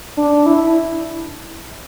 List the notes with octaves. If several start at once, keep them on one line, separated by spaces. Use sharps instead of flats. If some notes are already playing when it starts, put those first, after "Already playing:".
D4
E4